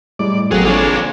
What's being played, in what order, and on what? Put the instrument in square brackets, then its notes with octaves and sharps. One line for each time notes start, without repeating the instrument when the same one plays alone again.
[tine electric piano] A2 G3 G#3 [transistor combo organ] D5
[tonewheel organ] G#1 F3 A4 [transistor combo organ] F#3 [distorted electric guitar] G#3 G#4 [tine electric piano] A#3 C4
[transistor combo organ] D4 G#4 [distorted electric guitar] F4 C#5